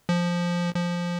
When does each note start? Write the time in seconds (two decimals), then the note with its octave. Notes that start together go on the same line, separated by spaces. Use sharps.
0.09 F3
0.75 F3